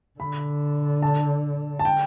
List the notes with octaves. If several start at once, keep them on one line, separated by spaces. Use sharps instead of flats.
D3 B5
A5
A5
G5